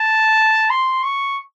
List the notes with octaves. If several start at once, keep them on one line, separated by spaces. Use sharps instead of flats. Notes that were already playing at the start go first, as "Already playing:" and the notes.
Already playing: A5
C6
C#6